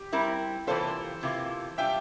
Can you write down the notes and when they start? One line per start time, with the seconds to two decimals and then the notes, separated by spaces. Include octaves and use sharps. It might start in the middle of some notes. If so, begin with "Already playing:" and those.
Already playing: G4
0.12 G3 C4 E4 A#4
0.67 C3 E3 A#3 F4 A4 C5
1.23 C3 E3 A#3 F4
1.78 G3 D4 F4 E5 G5